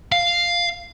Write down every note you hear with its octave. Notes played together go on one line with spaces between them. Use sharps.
F5